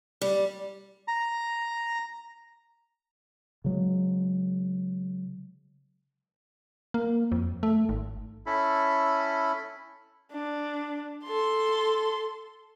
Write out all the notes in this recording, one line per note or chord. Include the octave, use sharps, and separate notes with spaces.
G3
A#5
C#3 F#3 G#3
A#3
F2
A3
G#1
C#4 E4 A4 B5
D4
A4 C6